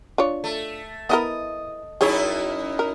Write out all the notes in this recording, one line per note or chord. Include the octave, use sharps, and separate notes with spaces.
D4 F4 C#5
A3
B3 E4 A#4 D#5
F#2 D#4 E4 G#4 C#5
A#4